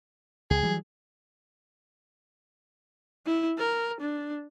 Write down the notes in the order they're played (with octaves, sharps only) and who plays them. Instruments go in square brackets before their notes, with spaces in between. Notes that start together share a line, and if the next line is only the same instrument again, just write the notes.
[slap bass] C#2 [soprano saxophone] G#4
[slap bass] E3 F#3 G3
[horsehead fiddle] E4
A#4
D4